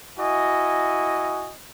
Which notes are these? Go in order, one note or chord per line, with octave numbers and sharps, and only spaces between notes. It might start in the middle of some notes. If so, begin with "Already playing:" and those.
E4 F#4 D#5 G#5